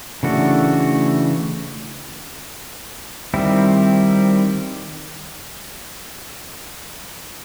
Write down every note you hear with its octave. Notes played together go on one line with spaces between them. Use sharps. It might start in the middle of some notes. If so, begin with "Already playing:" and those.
C#3 E3 A3 D4 F#4
D#3 G3 C4 E4